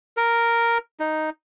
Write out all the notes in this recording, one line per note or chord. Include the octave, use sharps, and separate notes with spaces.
A#4
D#4